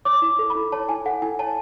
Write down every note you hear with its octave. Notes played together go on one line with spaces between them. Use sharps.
C#5 D6
E4
A4
B5
E4
C#5 A5
E4 G#5
A4 F#5
E4 G#5
C#5 A5